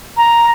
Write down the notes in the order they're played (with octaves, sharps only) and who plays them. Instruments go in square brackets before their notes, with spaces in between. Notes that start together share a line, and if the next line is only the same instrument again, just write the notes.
[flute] A#5